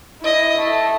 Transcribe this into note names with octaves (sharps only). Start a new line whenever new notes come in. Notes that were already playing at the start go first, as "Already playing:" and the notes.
E4 D#5
A3